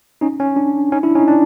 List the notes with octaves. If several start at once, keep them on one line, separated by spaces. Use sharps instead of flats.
C#4 D#4
C#4
D4
C#4 D#4
D4 E4
C#4 D#4
D4